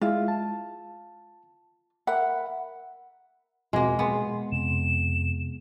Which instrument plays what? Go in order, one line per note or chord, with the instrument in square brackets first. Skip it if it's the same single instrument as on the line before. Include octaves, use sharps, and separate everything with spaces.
[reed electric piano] G#3 E4 [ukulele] F4
[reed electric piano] A5
[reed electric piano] A#4 E5 B5 [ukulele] F#5
[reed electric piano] E2 C4 F#4 [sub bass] B2 [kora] G#3 A#3
[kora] B3 [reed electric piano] G#4 G#5 C6
[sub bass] F2 [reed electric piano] C3 [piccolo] E7